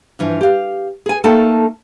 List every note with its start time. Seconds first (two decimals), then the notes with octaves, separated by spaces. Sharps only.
0.19 G2 E3 F3
0.41 G4 F5
1.06 G#4 G#5
1.24 A3 A#3 D#4 A4 G5 A5